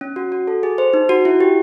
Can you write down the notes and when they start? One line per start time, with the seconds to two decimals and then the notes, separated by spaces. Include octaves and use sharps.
0.01 C#4
0.16 F#4
0.32 F#4
0.47 A4
0.63 G#4
0.78 C5
0.94 D#4
1.09 F#4
1.25 E4
1.40 G4